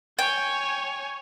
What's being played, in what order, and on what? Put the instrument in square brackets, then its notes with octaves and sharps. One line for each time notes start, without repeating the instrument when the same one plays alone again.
[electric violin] C#5 G#5 [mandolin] G5